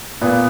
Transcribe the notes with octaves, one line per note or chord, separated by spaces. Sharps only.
A#2 B3